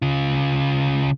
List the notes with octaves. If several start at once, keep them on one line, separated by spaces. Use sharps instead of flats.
C#3 F4